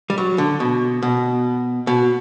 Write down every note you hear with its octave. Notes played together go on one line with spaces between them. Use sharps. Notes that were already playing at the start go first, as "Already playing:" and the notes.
G3
F#3
D3
B2
B2
B2